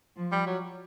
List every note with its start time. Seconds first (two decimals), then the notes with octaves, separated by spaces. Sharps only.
0.16 F3
0.32 G3
0.47 F#3